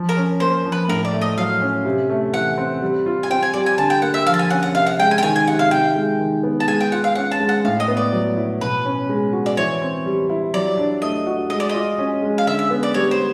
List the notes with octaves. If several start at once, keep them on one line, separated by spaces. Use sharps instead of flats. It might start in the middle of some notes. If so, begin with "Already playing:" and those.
Already playing: F3
A#4
C#4
A#3 C5
F3
B4
A2 A#4
D5
A3
D#5
F#3 F5
C#4
C3
A3
E3 F#5
C4
G3
F4
G#5
C4 G5
G#5
G3 D5
G#5
D3 A5
G5
A#3 F#5
E5
F3 F5
A5
G#5
C#4 F#5
F#5
C3 F5
F#5
G#3 G5
G#5
G5
D#3 G#5
G#5
C3 F#5
F5
C3 G5
G#3
D#3
B3
A5
G#3 G#5
G5
F4 F#5
F5
C#4 F#5
A5
G#3
F#5
A2 F5
D#5
B3
D5
F#3
E4
B2 B4
C#4
G#3
F#4
D5
E3 C#5
C4
G3
E4
F#3 D5
D4
A3 D#5
F#4
G#3 D#5
D5
F4 D#5
C#4
G#3
F5
D3 E5
E5
B3
D5
G3 C#5
C5